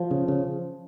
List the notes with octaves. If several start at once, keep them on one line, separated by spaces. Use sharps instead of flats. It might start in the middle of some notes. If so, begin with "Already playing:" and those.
Already playing: F3
C#3
C#3